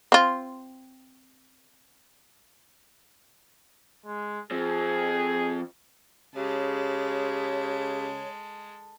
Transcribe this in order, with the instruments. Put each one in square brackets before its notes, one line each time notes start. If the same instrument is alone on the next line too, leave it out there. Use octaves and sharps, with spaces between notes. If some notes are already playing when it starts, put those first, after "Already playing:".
[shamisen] C4 F4
[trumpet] G#3
[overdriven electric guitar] F3 C4 [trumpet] G#4
[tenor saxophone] C#3 [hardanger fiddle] G#3 A4 [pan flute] G4 [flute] C#5